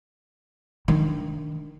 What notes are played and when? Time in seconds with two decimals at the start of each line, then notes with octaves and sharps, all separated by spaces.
0.88 D#3 D4